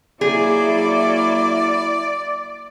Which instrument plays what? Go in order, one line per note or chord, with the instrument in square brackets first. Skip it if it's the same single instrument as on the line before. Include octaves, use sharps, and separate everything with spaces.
[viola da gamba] F#3 A#3 [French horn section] E4 [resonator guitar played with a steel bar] G#4 [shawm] D5